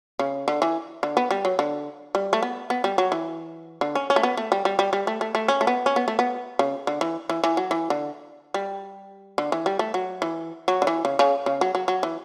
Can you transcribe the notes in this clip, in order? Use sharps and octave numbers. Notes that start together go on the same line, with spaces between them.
C#3
D3
E3
D3
B3
G3
F#3
D3
G3
A3
B3
B3
G3
F#3
E3
D3
C#4
C#4
A3
B3
A3
G3
G3
G3
G3
A3
A3
A3
C#4
A3
B3
C#4
B3
A3
B3
C#3
D3
E3
E3
E3
F#3
E3
D3
G3
D3
E3
G3
A3
F#3
E3
F#3
D3
E3
C#3
C#3
C#3
F#3
F#3
F#3
E3